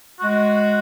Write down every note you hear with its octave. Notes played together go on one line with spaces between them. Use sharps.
G#3 F#4